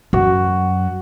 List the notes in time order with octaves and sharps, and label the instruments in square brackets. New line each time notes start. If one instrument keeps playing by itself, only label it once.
[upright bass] F#2 [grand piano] F#4